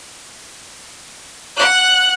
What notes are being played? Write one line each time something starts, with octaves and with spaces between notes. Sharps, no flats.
F#5 F#6